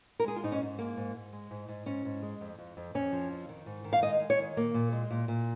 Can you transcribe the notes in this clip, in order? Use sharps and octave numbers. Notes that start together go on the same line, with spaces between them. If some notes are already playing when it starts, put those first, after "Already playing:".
A#4
G#3 G#4
F4
G#2 D#4
C#4
G#2
G#3 A#3
G#2
G#2
G#3
G#2
G#2
G#2 C#4
G#2
G#3
F2
F2
F2
F2 C#4
F3
F2
D#3
G#2
D#3
F5
G#3 D#5
G#3
C#5
D#3
A#2 A#3
A#2
G#3
A#2
A#2